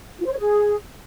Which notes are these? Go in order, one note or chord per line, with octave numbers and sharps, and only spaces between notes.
F4
C5
C#5
G#4